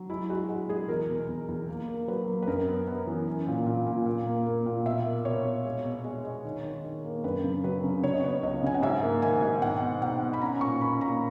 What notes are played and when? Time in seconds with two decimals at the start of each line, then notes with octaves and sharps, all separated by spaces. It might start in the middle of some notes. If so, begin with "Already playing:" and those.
Already playing: F#3
0.10 G#3 E4
0.29 G#3 F#4
0.49 G#3 F#4
0.69 G#3 G#4
0.89 E2 A#4
1.09 B2
1.28 E2
1.48 E2
1.68 A#3
1.88 A#3
2.08 F#3 B4
2.27 A#3
2.42 B4
2.47 F#2 A#4
2.68 B3
2.87 B3
3.07 E3
3.27 C#4
3.47 A#2
3.66 A#2
3.87 A#2
4.06 A#2
4.26 A#3
4.46 A#3
4.66 A#2
4.86 B2 E5
5.06 A#3
5.25 B2 C#5
5.45 B2
5.65 G#3
5.85 B2
6.05 G#3
6.25 G#3
6.45 D#3
6.64 D#3
6.84 D#3
7.04 A#3
7.24 F#2 B4
7.44 C#3
7.64 F#3 B4
7.84 C#3
8.03 C#3 C#5
8.14 D#5
8.23 B3 C#5
8.43 C#2 D#5
8.63 C#3 G#5
8.74 F#5
8.82 G#2 E5
9.03 A#3
9.22 D#3 G#5
9.42 G#2
9.62 B2 F#5
9.82 B2
10.02 B2 F#5
10.22 B2
10.33 B5
10.41 C#4 A#5
10.61 A#2 C#6
10.81 C#4 B5
11.00 A#2 A#5